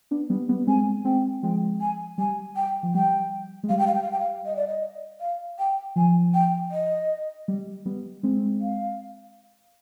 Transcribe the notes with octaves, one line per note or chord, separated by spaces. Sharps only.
B3 D4
G3 B3
G3 B3
G#3 C4 G#5
G#3 C4 G5
F3 G#3 G5
G#5
G3 G#5
G5
F3
G3 G5
G#3
G3 F5
G5
F5
G5
F5
G5
F5
D#5
D5
D#5
F5
G5
F3 G#5
G5
D#5
G3
G3 B3
G#3 C4
F5